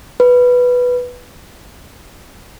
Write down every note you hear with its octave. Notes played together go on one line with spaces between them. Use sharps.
B4